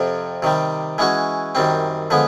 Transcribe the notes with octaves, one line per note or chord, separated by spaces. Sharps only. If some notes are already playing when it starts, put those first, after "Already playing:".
Already playing: F2 C3 F3
C3 D#3 G3
E3 G#3 C#4 F#4
F#2 D#3 G3 C4
D3 F3 G#3 B3